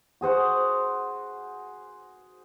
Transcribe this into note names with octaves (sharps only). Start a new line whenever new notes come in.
F#4 G#4 C5 F#5